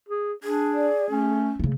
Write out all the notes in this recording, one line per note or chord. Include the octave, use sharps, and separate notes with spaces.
G#4
D4 G#4
D5
A3 C#4
C#3 A3